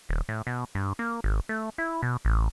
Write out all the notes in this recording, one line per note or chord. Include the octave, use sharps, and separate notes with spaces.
D#1
A2
B2
G2
A#3
G#1
A3
E4
B2
A1